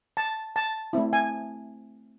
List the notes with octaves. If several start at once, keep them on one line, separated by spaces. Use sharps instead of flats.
A5
A5
A3 C4 E4
G#5